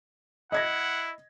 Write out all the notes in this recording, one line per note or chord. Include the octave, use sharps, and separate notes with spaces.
E4 D#5 F#5 G#6 A#6